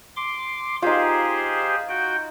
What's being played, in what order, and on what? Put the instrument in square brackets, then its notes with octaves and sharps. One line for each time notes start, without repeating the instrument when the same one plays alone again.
[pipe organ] C6 D6
[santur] D#4 F4 [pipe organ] G4 G#4 C5
[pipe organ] F#4 G5